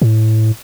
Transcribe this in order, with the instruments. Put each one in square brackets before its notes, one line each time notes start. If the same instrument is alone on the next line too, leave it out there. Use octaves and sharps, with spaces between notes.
[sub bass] A2